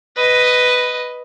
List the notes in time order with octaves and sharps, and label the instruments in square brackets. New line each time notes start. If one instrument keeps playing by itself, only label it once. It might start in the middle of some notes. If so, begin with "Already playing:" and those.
[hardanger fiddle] B4 D#5